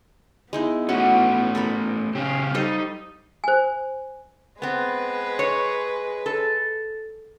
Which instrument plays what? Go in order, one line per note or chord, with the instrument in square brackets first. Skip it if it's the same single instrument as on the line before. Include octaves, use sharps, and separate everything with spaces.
[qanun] G#3 D#4 E4 [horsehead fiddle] B3
[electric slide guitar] A3 C#4 [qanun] F#4
[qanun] A4 A#4 B5
[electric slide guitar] C#3 G4 [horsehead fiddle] C#4 F5
[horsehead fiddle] G3 [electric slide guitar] D#4 [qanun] A4 C5
[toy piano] C5 G#5
[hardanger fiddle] G#3 B4 [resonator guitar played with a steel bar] B3 C4
[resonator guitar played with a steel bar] C#5
A4